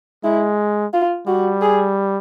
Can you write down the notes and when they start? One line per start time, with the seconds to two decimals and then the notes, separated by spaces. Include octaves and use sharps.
0.24 G#3 E4
0.93 F4
1.27 G3 F#4
1.62 G#4